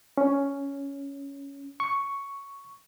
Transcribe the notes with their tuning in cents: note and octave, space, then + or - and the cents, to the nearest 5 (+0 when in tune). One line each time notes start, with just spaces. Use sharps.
C#4 +5
C#6 +5